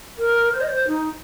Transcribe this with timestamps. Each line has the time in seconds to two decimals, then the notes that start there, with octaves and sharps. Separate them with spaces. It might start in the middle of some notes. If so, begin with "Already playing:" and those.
0.18 A#4
0.52 C5
0.61 D#5
0.68 C5
0.87 D#4